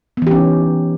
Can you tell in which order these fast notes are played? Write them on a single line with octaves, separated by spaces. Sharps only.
B3 E3 G4 C#4 D#4